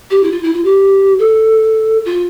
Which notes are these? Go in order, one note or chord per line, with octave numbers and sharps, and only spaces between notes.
G4
E4
F4
E4
F4
G4
A4
F4